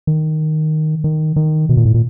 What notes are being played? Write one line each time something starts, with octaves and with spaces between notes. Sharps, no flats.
D#3
D#3
D#3
B2
A#2
A2
A#2